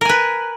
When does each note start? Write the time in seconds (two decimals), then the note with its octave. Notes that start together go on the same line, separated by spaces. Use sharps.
0.01 A#4
0.05 G#5
0.09 B4